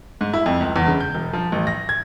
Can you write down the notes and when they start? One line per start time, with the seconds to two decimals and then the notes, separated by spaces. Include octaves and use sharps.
0.21 G#2
0.34 E4
0.46 F2
0.61 C#2
0.76 E2
0.87 C#3
1.01 G6
1.14 E1
1.33 F3
1.52 A1
1.67 A#6
1.89 G#6